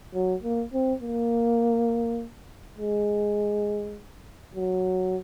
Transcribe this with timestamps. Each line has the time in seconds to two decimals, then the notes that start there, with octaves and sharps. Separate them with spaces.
0.14 F#3
0.43 A#3
0.73 C4
1.02 A#3
2.78 G#3
4.55 F#3